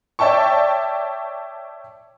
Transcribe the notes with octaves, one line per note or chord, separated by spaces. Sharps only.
C#5 D5 E5 G5 A5 C#6